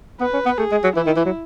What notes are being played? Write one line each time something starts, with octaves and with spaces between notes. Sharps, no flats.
B3 B4
C#4
B3
A3 G#4
G#3
F#3
E3 E4
D#3
E3
F#3